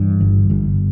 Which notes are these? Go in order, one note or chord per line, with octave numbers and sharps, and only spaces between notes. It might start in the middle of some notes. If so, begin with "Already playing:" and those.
Already playing: G2 E3
G1
G1